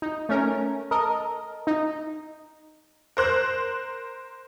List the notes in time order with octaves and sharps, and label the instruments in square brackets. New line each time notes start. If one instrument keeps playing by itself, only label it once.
[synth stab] D#4
A3 C#4 A#4
A4 A#4 D#5
D#4
[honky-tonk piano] A#4 C5 F#6